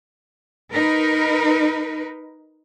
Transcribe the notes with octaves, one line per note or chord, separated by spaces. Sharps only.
D#4 A#4 B4